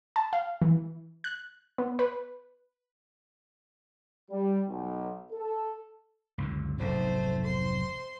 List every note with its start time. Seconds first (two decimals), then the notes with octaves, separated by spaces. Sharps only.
0.16 A5
0.33 F5
0.62 E3
1.24 F#6
1.78 B3
1.99 B4
4.30 G3
4.68 B1
5.32 A4
6.38 C#2 F#2 D3
6.79 F1 B1 G#2 A3 C5
7.45 C5 C6